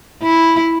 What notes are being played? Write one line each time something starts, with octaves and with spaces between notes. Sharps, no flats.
E4